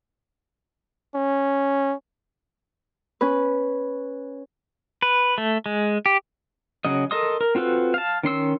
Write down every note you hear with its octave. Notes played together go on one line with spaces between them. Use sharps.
C#4
C#4 B4
B4
A3
G#3
G4
C#3 F#3 D#5
A4 A#4 D#5 C6 D#6
A#4
C4 F4 F#4 A4 B4
F5 A5
D#3 C#4 C6 E6